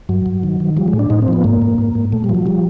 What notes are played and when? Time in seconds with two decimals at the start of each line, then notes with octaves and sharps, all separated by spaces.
0.09 G2 F#3
0.26 G2
0.43 D#3
0.60 D#3
0.77 F3 G3
0.88 G#3
0.93 A2
0.99 D4
1.10 A2 D#4
1.22 C4
1.28 F3 B3
1.44 G#2 A#3
1.62 G#2
1.78 G#2
1.95 G#2
2.12 A#2 A3
2.24 G3
2.29 F3
2.35 F#3
2.46 F3 G3